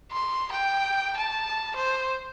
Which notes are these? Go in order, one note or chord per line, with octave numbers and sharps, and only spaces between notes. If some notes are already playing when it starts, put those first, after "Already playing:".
C6
G5
A5
C5